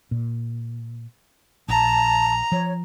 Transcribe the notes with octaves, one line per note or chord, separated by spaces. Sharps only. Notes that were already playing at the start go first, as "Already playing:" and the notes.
A#2
A#1 A5 A#5
F3 C#5